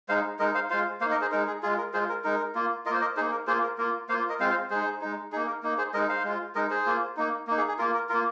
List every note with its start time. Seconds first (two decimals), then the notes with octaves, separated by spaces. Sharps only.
0.09 G#3 D#4 C5 F5
0.39 G#3 D#4 A#4 D#5
0.55 C5 F5
0.70 G#3 F4 C5 F5
1.01 A#3 C5 F5
1.05 D#4
1.11 A#4 D#5
1.22 G#4 C5
1.32 G#3 D#4 A#4
1.47 G#4
1.63 G#3 F4 G#4
1.78 A#4
1.93 G#3 F4 G#4 C5
2.09 A#4
2.24 G#3 D#4 A#4
2.55 A#3 F4
2.86 F4 A#4 D#5
2.90 A#3 C5
3.01 A#4 D#5
3.16 D#4 G#4 C5
3.21 A#3
3.32 A#4
3.47 A#3 F4 G#4 C5
3.63 A#4
3.78 A#3 F4 A#4
4.09 A#3 C5 F5
4.14 F4
4.29 A#4 D#5
4.40 G#3 C4 F4 C5 F5
4.50 C5 F5
4.70 G#3 D#4 G#4 C5
5.01 G#3 D#4
5.32 A#3 D#4 G#4
5.47 A#4
5.63 A#3 D#4
5.78 G#4 C5
5.94 G#3 A#4 D#5
5.97 D#4
6.09 C5 F5
6.25 G#3 F4
6.55 G#3 D#4 A#4 D#5
6.70 G#4 C5
6.86 A#3 F4
7.17 A#3 D#4
7.47 A#3 D#4
7.58 G#4
7.68 G#4
7.78 A#3 F4 A#4
7.94 A#4
8.09 A#3 F4 A#4